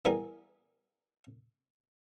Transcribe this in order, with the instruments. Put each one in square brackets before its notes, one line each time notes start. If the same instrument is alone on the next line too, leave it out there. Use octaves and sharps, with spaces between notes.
[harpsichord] E3 G3 B3 G#4 A#4